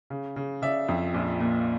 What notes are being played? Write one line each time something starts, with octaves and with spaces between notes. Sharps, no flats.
C#3
C#3
C#3 D5 E5
F2
A#1
A#2